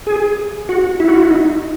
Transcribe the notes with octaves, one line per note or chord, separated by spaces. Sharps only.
G#4
F#4
E4
F#4
E4
D#4